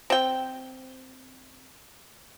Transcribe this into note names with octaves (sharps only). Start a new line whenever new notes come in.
C4 G5